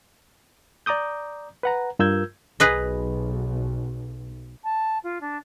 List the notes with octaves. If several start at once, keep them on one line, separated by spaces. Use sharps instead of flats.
D5 A#5 D6 D#6 G6
B4 F#5 A#5
G2 F4 A#4 E6 G6 G#6
B1 G#4 B4 D#5
A5
F4
D4